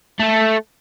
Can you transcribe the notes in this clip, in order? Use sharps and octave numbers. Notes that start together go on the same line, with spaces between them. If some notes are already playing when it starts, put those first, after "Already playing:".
A3 A4